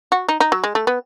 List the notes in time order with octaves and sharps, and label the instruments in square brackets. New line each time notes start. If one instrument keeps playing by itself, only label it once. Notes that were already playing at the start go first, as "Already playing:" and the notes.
[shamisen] F#4
D#4
D#4
F#3
G#3
A3
B3